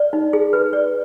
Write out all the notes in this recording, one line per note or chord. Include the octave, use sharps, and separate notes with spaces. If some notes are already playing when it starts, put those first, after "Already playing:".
Already playing: D5
D#4
G#4
B4
D5